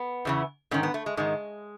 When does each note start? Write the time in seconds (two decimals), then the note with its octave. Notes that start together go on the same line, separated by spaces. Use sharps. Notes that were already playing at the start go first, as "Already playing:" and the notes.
Already playing: B3
0.25 E2 C#3 E3
0.71 G#2 D#3 C#4
0.83 B3
0.94 A3
1.06 G#3
1.17 G#2 D#3 G#3